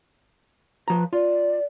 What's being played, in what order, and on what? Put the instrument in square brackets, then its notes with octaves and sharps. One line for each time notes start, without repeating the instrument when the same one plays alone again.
[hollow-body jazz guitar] F3 A#5 [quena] B4
[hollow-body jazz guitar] F4 [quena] D5